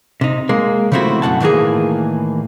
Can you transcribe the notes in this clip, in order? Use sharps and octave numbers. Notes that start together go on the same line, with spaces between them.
C3 D#4
G#3 A#3
C#3 F3 A3 C4 E4 F#4
F#2 B2 F#5 A5
A2 D#3 E3 G3 A#3 G#4